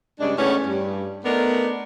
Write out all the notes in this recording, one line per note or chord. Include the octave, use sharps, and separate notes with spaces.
G2 C#3 G#3 D4
E2 A2 B3 C#4
G2
A3 B3 D4 D#4 A#4